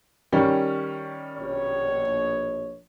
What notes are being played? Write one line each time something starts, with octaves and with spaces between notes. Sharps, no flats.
D#3 G3 C#4
A#1 B2 C#5